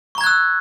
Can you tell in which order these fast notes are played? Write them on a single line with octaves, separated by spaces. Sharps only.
C#6 A#5 G#6 F#6 E6